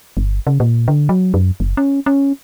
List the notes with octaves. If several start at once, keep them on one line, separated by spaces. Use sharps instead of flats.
G1
C#3
A#2
D3
F#3
F#2
F#1
C#4
C#4